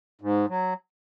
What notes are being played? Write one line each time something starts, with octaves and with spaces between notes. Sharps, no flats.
G#2
F#3